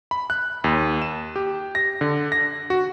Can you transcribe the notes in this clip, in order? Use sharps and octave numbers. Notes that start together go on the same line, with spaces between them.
B5
F#6
D#2
E7
G4
A#6
D3
A#6
F#4